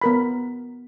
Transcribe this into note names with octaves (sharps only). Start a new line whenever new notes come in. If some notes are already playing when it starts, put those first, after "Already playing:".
B3 A#4 B5